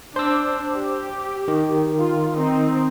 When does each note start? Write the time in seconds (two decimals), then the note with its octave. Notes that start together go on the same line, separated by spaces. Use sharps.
0.16 D4 C5 E6
0.74 G4
1.48 D#3
2.00 F4
2.37 C4 D#4